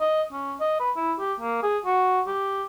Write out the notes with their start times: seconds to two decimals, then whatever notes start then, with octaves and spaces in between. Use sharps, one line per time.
0.01 D#5
0.32 C#4
0.60 D#5
0.80 B4
0.96 E4
1.19 G4
1.40 A#3
1.63 G#4
1.85 F#4
2.27 G4